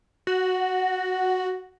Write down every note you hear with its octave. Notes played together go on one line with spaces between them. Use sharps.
F#4